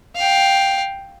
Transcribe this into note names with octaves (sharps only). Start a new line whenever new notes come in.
F5 G5